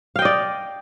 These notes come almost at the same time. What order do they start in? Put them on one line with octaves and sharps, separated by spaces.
F5 G5 D#5 D5